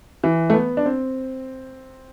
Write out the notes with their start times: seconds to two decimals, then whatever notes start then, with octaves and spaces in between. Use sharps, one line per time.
0.24 E3
0.50 A3
0.54 B3
0.77 D4
0.86 C4